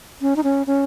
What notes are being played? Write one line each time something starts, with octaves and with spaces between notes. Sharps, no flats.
C#4
D#4
C#4
C#4